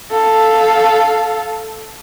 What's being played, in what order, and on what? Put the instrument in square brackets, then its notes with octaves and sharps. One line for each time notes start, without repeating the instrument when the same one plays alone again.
[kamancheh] A4 F5